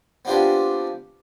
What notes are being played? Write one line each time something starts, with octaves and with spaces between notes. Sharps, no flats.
B3 C4 D4 F4 G4 G#5